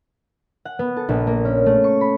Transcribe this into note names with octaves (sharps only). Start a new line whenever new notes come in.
F#5
B3
A4
A#1
A#3
C#4
A3
C#6
B5